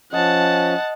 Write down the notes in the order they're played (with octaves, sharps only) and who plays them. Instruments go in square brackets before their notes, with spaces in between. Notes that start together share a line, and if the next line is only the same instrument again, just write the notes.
[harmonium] F3 C#4 [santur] D#5 [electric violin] F#5 A5